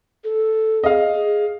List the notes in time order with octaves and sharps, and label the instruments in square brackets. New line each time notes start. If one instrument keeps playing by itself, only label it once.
[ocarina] A4
[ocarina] G#4 [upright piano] D#5 F5
[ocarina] G#4